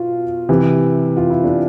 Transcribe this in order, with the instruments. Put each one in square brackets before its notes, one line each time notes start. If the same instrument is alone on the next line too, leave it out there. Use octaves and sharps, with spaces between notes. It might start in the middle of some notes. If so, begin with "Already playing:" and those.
Already playing: [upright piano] B2 F4
C3 E3
F4
E4
D4